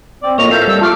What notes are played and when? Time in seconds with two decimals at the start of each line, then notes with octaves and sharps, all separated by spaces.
0.23 C4 D5
0.38 F2 A2 A#3 C#5 D#5 F7
0.51 A4 A#4 E5 F5 G6
0.67 G3 E6
0.81 A3 F4 A5 D6 F6